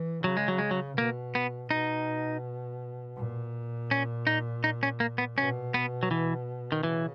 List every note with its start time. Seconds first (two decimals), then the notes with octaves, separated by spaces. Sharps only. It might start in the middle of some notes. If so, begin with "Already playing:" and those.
Already playing: E3
0.24 C#3 F#3
0.37 G#3
0.48 F#3
0.58 G#3
0.71 F#3
0.98 B2 A#3
1.35 B3
1.71 B2 D#4
3.17 A#2
3.91 C#4
4.27 D#4
4.64 D#4
4.83 C#4
5.00 A#3
5.18 B3
5.37 B2 C#4
5.74 B3
6.03 F#3
6.11 E3
6.72 D#3
6.83 C#3 E3